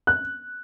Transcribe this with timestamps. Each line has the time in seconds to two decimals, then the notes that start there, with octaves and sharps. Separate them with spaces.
0.07 F#6